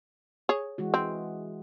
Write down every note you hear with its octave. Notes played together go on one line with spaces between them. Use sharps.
G#4 C#5
E3 G#3 F#4
C4